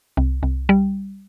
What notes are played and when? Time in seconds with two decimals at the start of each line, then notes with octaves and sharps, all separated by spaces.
0.17 C2
0.43 C2
0.69 G3